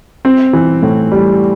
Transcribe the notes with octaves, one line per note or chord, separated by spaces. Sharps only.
C4
E3
A2
G3